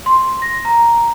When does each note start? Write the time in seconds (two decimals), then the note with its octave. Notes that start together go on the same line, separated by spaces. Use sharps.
0.06 C6
0.42 A#6
0.65 A#5